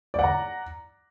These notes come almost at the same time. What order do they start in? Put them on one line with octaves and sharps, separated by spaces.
D5 F#5 A#5